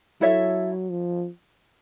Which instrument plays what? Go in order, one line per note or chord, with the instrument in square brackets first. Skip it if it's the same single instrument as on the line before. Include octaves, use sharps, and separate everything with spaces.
[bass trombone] F#3 [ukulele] E4 A4 C#5 E5
[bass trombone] F3